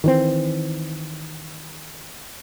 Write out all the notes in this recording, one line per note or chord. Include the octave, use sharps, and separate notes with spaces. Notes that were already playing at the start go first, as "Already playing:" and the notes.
D#3 E3 C4